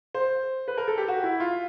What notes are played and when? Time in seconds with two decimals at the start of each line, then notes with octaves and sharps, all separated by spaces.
0.15 C5
0.68 B4
0.78 A#4
0.88 A4
0.98 G4
1.08 F#4
1.24 E4
1.40 F4